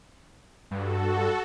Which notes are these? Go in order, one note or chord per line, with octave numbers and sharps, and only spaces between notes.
G2 F#4 A4